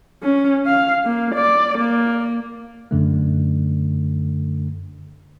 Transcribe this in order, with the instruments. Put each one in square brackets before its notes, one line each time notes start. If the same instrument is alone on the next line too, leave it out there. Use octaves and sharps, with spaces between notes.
[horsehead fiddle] C#4
F5
A#3
D5
A#3
[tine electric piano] F#2 D3 A3